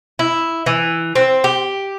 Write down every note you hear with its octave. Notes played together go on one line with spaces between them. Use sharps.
E4
E3
C4
G4